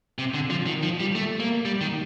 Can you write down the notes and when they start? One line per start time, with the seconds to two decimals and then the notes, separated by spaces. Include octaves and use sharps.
0.18 C3
0.34 D3
0.50 F3
0.67 D#3
0.83 F3
1.00 G3
1.15 A3
1.40 A#3
1.65 G3
1.81 D#3